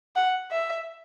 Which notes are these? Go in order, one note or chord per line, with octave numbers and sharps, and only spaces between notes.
F#5
E5